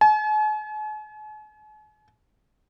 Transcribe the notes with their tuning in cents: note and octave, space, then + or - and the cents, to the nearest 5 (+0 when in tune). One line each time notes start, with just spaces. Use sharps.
G#5 +45